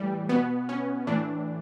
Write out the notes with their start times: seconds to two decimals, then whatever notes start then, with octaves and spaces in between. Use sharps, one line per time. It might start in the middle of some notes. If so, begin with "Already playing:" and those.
Already playing: A2 E3 G3
0.29 B2 B3
0.69 C#4
1.07 A2 E3 D4